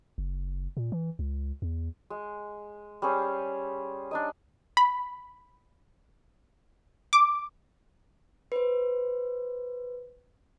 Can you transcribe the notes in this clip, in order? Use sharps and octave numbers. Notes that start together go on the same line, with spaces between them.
F#1
A#2
E3
C#2
E2
G#3
G3 C#4 G#4 C5
D4 D#4 D#5
B5
D6
B4 C5